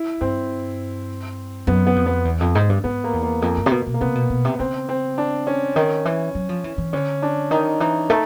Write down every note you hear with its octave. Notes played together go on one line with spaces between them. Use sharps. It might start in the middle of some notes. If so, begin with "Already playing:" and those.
Already playing: E4
G2 C4
F#2 B3
B3
F2
B3
E2
F2
G#2
G2
G#2 B3
A#3
E2
A#3
F2 A#3
G2
C3
B2
B2
A#3
C3 B3
B2
B2
C3
C#3 C4
C4
D4
C#4
D#3
E3
F#3
F3
E3
E3
D3 C#4
D4
D#3 D#4
E3 D#4
A3 D#4